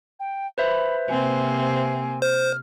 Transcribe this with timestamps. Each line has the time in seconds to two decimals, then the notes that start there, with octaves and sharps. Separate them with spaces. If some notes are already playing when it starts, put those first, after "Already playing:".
0.20 G5
0.58 B4 C5 E5 B5
1.09 C3 A#3 C4 G#5
2.22 C5 F6